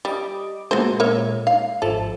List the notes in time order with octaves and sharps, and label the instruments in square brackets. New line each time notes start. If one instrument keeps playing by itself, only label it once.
[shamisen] G3 [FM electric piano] D#5 D6
[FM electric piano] A#2 G#3 [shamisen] B3 F#4 C5
[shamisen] A#4 C#5 E5
[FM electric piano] D#4 [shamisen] F5
[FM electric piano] G#1 F3 E5 [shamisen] A4